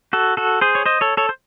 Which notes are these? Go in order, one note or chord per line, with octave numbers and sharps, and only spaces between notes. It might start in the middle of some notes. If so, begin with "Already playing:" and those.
F#4 A4
F#4 A4
G#4 C5
C#5
C5 D#5
A4 C#5
A4 C#5
C5